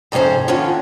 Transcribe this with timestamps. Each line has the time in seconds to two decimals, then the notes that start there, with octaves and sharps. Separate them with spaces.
0.12 F2 G#2 C3 C#4 C5
0.48 D3 D#3 C#4 F4